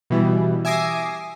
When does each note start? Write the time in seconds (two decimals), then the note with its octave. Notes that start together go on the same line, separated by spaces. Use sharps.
0.10 B2 E3 G3
0.65 E5 G#5 D6 D#6 A#6 C7